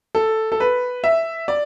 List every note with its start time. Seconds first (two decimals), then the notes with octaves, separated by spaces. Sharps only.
0.15 A4
0.52 A4
0.60 B4
1.04 E5
1.48 D5